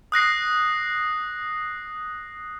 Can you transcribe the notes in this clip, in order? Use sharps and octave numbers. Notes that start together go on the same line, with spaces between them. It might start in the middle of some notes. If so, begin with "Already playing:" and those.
D#6 F#6 A#6 C7